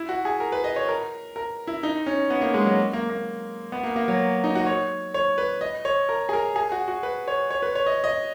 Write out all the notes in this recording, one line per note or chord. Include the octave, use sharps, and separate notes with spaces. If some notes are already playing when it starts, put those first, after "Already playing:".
Already playing: E4
F#4
G#4
A#4
B4
D#5
C#5
A#4
A#4
E4
D#4
C#4
B3
A#3
G#3
F#3
A#3
A#3
B3
A#3
A#3
F#3
D#4
F#4
C#5
C#5
B4
D#5
C#5
A#4
G#4
A#4
G#4
F#4
F#4
B4
C#5
C#5
B4
C#5
D#5
D#5